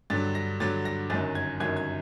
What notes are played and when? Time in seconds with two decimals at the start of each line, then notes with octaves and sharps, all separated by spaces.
0.10 G2 D3 F#3 A6
0.35 A#6
0.60 G2 D3 F#3 A6
0.85 A#6
1.10 G1 F#2 D#3 F#3 A6
1.35 G#6
1.60 G1 F#2 D#3 F#3 G#6
1.77 G#6